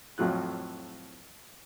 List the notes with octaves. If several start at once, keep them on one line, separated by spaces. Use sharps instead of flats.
F2 A2 F#3 F4 F#6